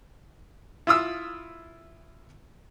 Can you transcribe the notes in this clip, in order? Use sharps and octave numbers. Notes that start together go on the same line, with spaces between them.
E4 F4 D#6 E6